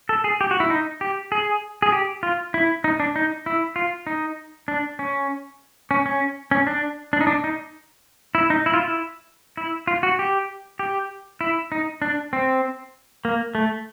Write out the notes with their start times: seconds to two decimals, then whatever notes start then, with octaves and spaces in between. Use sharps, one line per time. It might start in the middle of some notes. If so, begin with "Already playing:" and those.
0.09 A4
0.24 G#4
0.41 G4
0.51 F#4
0.60 E4
0.70 D#4
1.01 G4
1.32 G#4
1.82 G#4
1.92 G4
2.23 F4
2.54 E4
2.84 D#4
3.00 D4
3.16 D#4
3.46 E4
3.76 F4
4.07 D#4
4.68 D4
4.99 C#4
5.91 C#4
6.06 C#4
6.51 C#4
6.67 D4
7.13 D4
7.21 D#4
7.27 D4
7.44 D#4
8.35 E4
8.50 D#4
8.66 E4
8.74 F4
8.81 E4
9.57 E4
9.87 F4
10.03 F#4
10.19 G4
10.79 G4
11.41 E4
11.72 D#4
12.02 D4
12.33 C4
13.25 A#3
13.55 A3